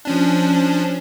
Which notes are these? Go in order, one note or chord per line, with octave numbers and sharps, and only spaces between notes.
F3 C#4 D4